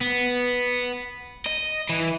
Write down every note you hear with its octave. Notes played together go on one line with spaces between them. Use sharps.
B3
D#5
E3